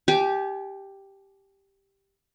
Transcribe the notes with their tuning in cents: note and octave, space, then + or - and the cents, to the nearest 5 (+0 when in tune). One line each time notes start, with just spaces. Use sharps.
G4 +0 G#5 +40